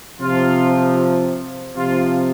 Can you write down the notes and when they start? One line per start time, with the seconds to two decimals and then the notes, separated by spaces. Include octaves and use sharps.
0.20 C3 F3 F4
1.76 C3 F3 F4